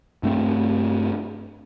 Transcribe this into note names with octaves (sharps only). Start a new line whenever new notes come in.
G2 A3 C4